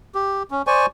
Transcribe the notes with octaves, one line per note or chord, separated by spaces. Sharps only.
G4
C#4
C5 D5 G#5 C#6